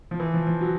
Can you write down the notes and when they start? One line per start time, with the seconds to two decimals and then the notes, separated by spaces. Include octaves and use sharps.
0.11 F3
0.20 E3
0.34 F3
0.47 F3
0.61 F#3